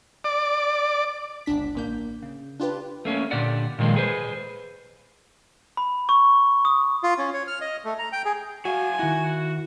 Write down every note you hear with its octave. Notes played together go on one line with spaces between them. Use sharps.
D5
G1 C#2 D4 B6
A1 A#3 G6
C#3
D4 F4 G4 B4
A3 A#3 C#4
A#2 D3 G4 D5 F#5
A#2 D#3 F3 G#3 A#3
G#4 B4 C5
B5
C#6
D#6
F4
C#4
C#5
F6
D#5
A3
A#5
G5
G#4
F#3 F#4 F5 G#5
D#3 E4 F#4